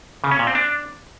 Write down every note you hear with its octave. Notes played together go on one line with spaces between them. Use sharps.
C#3
C#4
A#2
C4
D4